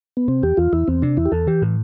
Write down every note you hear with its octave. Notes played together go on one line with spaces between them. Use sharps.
B3
C3 C4
E2 G4
E2 F4
E2 E4
E2 C4
C3 D4
E2 E4
G4
E2 A4
E3 G4
A2